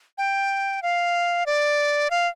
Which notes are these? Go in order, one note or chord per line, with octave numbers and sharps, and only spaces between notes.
G5
F5
D5
F5